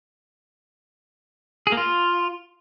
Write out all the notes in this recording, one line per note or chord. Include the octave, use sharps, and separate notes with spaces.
G#4
A#3
F4